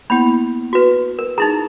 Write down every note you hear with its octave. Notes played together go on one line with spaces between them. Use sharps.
A#3 B3 E4 B5
F#4 B4
A#4
D#4 E4 G#4 A#5